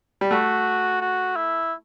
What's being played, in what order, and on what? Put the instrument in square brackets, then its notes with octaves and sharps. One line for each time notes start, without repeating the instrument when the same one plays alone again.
[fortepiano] G3
[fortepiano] A3 [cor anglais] F#4
[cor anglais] F#4
E4